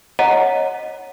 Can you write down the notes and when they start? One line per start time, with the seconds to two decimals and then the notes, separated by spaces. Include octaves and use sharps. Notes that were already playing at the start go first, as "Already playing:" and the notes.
0.19 C#5 D#5 F#5 A#5